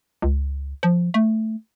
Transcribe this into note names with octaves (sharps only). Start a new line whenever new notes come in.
C#2
F3
A3